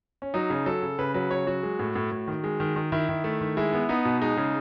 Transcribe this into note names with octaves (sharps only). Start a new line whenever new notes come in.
C#4
F#3 D#4
C#3
F#3 A4
C#3
C#3 B4
F#3 B4
C#3 C#5
F#3 F#4
G#3
A2
A2
A2
D#3
G#3
D#3
D#3
D#3 E4
D#3
A3
D#3
G#3 E4
B3
B3 D#4
B2
G#3 D#4
C#3